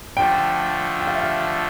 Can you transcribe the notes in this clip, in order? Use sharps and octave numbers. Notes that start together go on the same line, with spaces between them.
D3 F3 A3 G5
G5
F5
E5
F5